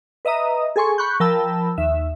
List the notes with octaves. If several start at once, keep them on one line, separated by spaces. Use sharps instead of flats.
B4 D#5 E5 A#5 D#6
G#4 A4 G#5 C6 C#6
B5 C#6 F#6 G6
F3 A#4 G5 A5 B5 E6
D#2 E5